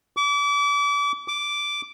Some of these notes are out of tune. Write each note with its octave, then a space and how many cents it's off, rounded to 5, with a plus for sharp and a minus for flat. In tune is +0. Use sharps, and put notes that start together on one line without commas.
D6 -35
D6 -5